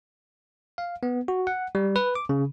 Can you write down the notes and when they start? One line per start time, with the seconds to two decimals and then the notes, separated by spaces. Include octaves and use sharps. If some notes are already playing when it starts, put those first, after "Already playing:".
0.78 F5
1.03 B3
1.28 F#4
1.47 F#5
1.75 G3
1.96 B4
2.15 D6
2.29 C#3